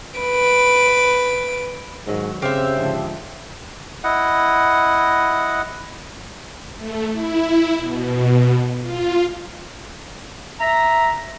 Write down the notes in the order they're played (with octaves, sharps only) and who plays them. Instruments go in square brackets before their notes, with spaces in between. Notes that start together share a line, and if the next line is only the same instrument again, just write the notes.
[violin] B4 D7
[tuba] G#2 [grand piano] D#3 F#3
[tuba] C#3 [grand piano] C4 F6 C7 [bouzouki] G4 E5 [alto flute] C5
[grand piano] G#2 D3 F3
[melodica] E4 D#5 F#5
[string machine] A3
E4
B2
F4
[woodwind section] E5 A#5